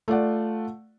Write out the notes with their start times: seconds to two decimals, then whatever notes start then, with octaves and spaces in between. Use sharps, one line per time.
0.08 A3 F4 D5 F#5